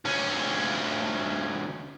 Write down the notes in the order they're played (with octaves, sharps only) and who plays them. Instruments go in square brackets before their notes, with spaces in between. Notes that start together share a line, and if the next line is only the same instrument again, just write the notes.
[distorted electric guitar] D2 C#4